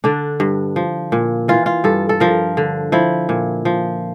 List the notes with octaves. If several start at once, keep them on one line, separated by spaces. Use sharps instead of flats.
D3 D4
G2
F3
A#2
E3 F4
F4
G2 A4
A4
F3 A#4
D3
F3 E4
A#2
F3